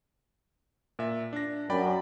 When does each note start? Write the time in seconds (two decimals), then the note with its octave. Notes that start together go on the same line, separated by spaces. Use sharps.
0.99 A#2 E5
1.33 D4 A#6
1.70 F#2 D5 G5 B5